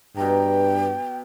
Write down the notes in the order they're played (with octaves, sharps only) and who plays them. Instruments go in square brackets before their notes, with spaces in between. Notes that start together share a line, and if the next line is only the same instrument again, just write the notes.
[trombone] G2 [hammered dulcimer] B2 A#5 [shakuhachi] G5